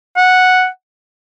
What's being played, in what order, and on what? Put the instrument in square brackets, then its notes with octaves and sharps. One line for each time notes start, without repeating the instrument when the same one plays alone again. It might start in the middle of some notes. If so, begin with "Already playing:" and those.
[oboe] F#5